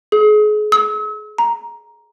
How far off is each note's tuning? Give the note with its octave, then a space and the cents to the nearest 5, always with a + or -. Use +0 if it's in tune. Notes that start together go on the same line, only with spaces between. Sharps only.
G#4 +30
E6 -40
A#5 +10